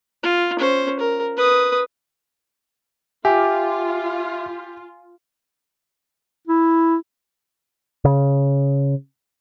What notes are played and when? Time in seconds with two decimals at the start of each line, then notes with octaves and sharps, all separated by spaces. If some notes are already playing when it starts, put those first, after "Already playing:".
0.23 F4
0.59 C#4 C5
0.99 A#4
1.36 B4 D#6
3.25 F4 G4 E5 G#5 D6
6.47 E4
8.05 C#3